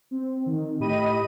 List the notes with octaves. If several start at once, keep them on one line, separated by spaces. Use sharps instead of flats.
C4
D#3
A2 G4 D#5 B5 D#7